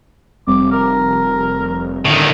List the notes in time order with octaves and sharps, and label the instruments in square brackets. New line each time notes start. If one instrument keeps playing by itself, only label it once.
[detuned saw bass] F1 [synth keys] G3 C4 [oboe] D6
[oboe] A#4
[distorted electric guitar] A2 D#3 [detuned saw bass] D3